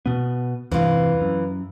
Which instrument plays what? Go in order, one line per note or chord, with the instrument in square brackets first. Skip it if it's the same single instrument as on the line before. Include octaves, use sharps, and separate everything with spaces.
[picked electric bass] B2 B3
[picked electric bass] E2 G2 C3 [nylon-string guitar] E3 F4
[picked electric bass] F#2